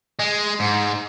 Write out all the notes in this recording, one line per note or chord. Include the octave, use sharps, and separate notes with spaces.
G#3
G#2